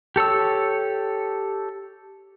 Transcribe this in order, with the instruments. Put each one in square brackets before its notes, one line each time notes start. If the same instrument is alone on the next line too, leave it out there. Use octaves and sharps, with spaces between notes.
[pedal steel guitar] G4 A4 C#5 E6